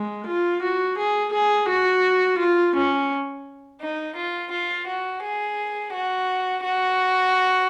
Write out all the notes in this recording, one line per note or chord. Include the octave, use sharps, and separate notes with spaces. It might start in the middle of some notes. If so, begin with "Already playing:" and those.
Already playing: G#3
F4
F#4
G#4
G#4
F#4
F4
C#4
D#4
F4
F4
F#4
G#4
F#4
F#4